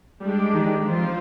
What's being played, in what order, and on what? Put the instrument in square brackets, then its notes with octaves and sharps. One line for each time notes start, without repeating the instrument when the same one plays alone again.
[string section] G3 [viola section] G#3 D4 G4 D5
[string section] D#3
[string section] F3 [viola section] C4 F4 C5